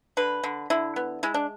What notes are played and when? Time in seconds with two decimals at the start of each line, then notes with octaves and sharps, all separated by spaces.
0.17 D3 B4
0.44 D3
0.70 D3 E4
0.96 B3
1.23 G#3 E4
1.34 D4